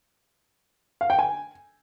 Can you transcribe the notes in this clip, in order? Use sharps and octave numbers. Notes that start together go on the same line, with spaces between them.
F5
G5
G#5